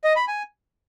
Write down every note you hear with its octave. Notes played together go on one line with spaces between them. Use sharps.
D#5
B5
G#5